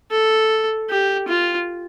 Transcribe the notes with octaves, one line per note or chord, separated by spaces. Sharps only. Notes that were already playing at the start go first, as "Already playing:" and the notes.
A4
G4
F4